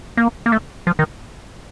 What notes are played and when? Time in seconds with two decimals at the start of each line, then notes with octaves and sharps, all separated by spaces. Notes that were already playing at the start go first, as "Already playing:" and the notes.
0.17 A#3
0.46 A#3
0.52 A3
0.87 F3
0.99 D#3